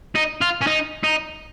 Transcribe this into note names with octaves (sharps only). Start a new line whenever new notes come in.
D#4
F4
C#4
D#4
D#4